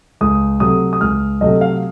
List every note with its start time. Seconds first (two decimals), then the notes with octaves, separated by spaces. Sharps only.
0.21 C#2 D#6
0.60 C3 F#3 A3 D#6
0.93 D#6
1.01 C#2 F6
1.41 C3 F#3 A3 D#5
1.61 F5